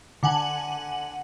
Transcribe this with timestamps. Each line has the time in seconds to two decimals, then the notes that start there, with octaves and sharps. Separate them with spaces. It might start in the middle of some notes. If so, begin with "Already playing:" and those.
0.23 D3 F#5 G#5 F#7